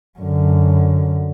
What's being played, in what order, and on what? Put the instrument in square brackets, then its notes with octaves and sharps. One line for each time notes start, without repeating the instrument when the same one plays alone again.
[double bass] F#2 D3